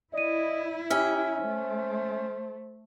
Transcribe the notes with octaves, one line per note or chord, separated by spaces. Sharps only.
E4 D5 D#5 D#7
C#4 G4 E5 F6
A3 C5